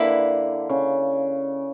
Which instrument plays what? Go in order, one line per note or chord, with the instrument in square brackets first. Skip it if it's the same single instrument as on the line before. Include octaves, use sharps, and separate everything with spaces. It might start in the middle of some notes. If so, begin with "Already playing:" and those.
Already playing: [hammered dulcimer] D3 [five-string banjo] A#3 E4 B4
[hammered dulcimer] C#3